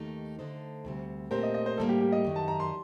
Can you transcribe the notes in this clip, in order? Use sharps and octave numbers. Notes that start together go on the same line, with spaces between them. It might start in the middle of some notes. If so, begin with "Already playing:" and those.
Already playing: D#2 D#3 A3 D#4 G4
D3 A3 D#4 A4 C5
D2 C3 G3 C4
A#2 A3 C4 G4 A#4 C5
D#5
D#5
C5
A2 G3 A#3 A4
G4
G4
D#5
F#2 D#3 F#3
A5
A#5
C6